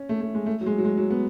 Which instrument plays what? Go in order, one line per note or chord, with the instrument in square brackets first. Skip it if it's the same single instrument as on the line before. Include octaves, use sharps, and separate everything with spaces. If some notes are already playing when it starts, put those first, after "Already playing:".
Already playing: [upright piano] C#4
A3
A3
G#3
A3
F#3
G#3
F#3
G#3
F#3
B3